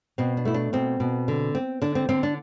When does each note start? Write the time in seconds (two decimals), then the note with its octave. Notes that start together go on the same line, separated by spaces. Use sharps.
0.18 B2 C4
0.37 D4
0.45 A3 E4
0.54 D4
0.73 B2 C4
1.00 B2
1.28 D3
1.55 C4
1.82 D3 D4
1.95 C4
2.09 D3 C4
2.23 D4